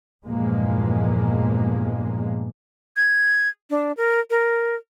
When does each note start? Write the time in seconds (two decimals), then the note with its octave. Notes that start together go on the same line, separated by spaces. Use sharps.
0.25 E2 G2 A#2 F3 G#3 A#3
2.97 G#6
3.70 D4
3.97 A#4
4.30 A#4